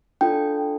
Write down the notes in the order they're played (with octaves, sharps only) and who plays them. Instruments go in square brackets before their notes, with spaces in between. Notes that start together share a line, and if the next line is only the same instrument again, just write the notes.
[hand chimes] D4 F4 A4 G5